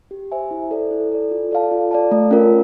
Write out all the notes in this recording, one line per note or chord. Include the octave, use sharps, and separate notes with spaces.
G4
C5 E5 G#5
E4
A4 D5
E4
A4 D5
F4
A4 D5 F5 A5
F4
A4 D5 F5 A5
A3
C#4 F4 A#4